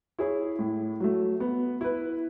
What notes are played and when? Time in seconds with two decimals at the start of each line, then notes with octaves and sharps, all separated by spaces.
0.19 E4 G#4 C#5
0.59 A2
1.00 F#3 A3
1.40 B3
1.81 E4 B4